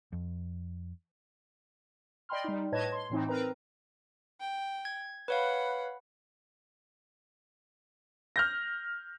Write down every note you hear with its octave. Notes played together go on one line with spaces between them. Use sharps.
F2
D5 D#5 G5 B5 C6 F6
G3 D#4
A2 B4 C#5 D#5 A5 G#6
C6
A2 E3 C4 D#4
C4 A#4 B4 A#5
G5
G#6
B4 C#5 F5 F#5 B5
F6 G6 A#6